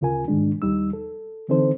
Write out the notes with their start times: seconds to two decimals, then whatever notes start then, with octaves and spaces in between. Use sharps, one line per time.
0.01 D2 C#3 F4 A#4 G#5
0.28 G#2 D#3 G#3 D4
0.62 D#2 G3 D#4 E6
0.93 A4
1.49 D3 E3 C4 D#4 A4 C5